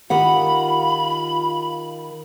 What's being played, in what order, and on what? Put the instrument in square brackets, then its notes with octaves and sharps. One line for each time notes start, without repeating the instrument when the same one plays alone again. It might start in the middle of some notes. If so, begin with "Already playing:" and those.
[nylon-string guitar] D#3 G4 F#5 [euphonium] F4 [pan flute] B5